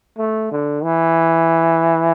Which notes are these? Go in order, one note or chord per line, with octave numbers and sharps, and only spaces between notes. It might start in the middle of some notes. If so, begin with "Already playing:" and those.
A3
D3
E3